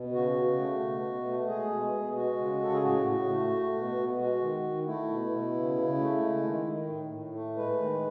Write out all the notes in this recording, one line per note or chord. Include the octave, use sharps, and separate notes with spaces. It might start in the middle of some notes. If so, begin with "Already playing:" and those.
Already playing: B2
C#3 F#4
C#3
A3
B2
B2
A3
G#3 G#4
B2
B2
G#3 F#4
C#3
C#3 A4
G#4
A2 F#4
A2
A3
A3
B2
B2
G#3 F#4
D#3
D#3
A3 E4
B2
B2
C#3
C#3
A3
G#3
D#3
D#3
A2
A2
A3
G#3 B4
D#3